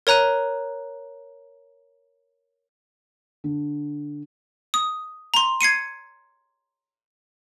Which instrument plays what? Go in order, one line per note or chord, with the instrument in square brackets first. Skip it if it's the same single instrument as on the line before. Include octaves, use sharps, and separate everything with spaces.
[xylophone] A#4 C#5 A#5 F#6 D#7
[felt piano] D3
[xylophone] D#6
A#5 C6
G#6 C7 C#7 D#7